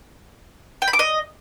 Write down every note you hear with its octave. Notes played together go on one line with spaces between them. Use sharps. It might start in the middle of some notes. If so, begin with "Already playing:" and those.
G5
B5
D6
D#5